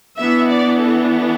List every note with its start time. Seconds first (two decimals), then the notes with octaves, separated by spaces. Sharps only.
0.17 E3 B3 D4 E5
0.48 D5
0.79 A4